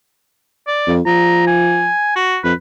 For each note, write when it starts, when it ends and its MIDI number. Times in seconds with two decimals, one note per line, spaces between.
0.68 0.93 74
0.87 1.00 41
1.06 1.90 53
1.06 1.47 82
1.47 2.11 80
2.16 2.37 66
2.44 2.53 41
2.44 2.53 71